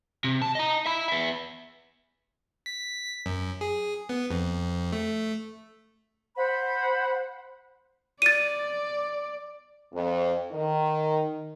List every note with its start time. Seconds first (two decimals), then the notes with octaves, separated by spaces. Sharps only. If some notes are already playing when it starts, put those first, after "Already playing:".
0.24 C3
0.42 A5
0.55 D#5 A#5
0.86 E5 B5
1.08 B3 E5
2.66 B6
3.26 F#2
3.61 G#4
4.09 B3
4.30 F2
4.92 A3
6.35 C5 F#5 B5
8.22 D5 A6 D#7
9.93 F2
10.51 D#3